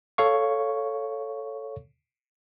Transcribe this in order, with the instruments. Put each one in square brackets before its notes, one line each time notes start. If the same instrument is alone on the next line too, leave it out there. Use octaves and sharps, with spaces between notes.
[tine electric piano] A4 C#5 F5 C#6